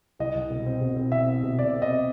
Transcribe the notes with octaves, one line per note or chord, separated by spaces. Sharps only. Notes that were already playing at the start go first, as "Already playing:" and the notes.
C2 D#5
C2
B2
C4
B2
C4
C4 E5
C4
B2
B2 D5
C4
D#5